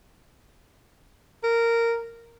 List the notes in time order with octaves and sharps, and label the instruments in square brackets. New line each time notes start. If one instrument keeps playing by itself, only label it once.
[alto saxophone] A#4